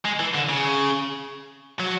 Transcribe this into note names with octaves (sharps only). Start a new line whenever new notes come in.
G#3
E3
D3
C#3
F#3